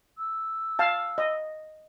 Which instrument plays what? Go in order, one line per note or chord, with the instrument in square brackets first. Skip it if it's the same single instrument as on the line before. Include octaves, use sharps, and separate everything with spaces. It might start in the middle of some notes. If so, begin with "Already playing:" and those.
[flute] E6
[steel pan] F5 A5
D#5